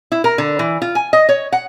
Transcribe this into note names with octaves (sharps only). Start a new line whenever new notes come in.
E4
A#4
D3
E3
F4
G#5
D#5
C#5
F#5